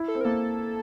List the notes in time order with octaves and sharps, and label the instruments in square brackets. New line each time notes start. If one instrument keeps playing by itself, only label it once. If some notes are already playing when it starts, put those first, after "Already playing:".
Already playing: [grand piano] E4
[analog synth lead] A4
[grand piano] C4
[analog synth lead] A#4
[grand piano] A#3 [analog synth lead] A4